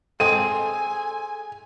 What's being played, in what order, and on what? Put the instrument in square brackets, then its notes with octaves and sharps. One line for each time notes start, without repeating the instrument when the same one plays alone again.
[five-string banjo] G#3 C4 G#4 [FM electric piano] A4 [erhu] G#5 [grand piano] D#7